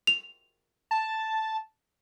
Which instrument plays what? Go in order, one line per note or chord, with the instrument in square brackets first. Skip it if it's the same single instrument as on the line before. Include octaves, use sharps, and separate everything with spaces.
[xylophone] F7
[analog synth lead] A5